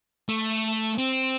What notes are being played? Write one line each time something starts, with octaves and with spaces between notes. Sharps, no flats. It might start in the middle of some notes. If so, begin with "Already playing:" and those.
A3
C4